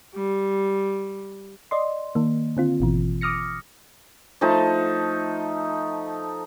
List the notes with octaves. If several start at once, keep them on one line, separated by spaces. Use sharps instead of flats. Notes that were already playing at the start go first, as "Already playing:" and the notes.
G3
D5 D#5 C6
D#3 A#3
D3 C4 F4
G#1 B2 E3
D6 D#6 F6 A#6 C#7
F3 A3 D#4 A5